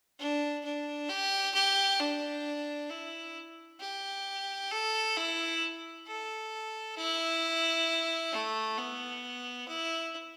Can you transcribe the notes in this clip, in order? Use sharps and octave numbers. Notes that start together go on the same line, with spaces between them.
D4
D4
G4
G4
D4
E4
G4
A4
E4
A4
E4
A3
B3
E4